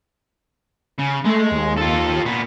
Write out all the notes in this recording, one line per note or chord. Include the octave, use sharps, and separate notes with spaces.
C#3
G#3 A3
D#2
F4 A4
A#2 B3